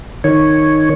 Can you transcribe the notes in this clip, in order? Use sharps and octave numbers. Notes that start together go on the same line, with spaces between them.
D#3 C#5